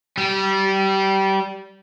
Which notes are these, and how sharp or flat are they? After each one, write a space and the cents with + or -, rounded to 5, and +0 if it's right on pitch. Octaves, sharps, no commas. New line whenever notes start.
G3 -20